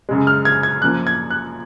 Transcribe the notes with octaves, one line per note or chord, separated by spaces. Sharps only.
F#2 C#3 G#3
F6
G#6
G#6
F#2 F3 A#3 F#6
G#6
F#6